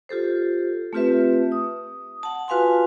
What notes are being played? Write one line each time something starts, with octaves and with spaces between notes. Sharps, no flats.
F4 G4 A4 C5
A3 C4 F4 G4 B4 E5
D#6
F#5 A5
F4 F#4 B4 F5 G#5 C6